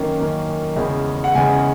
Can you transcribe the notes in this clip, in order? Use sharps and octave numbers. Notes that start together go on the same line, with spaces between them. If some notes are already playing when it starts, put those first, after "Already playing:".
Already playing: F#2 D#3 A#3 C#4
F#2 D#3 A#3 C#4
E2 C#3 G#3 C#4
F#5
E2 C#3 G#3 C#4 G#5